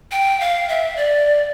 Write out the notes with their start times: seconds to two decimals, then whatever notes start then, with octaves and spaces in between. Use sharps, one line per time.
0.12 G5
0.40 F5
0.69 E5
0.97 D5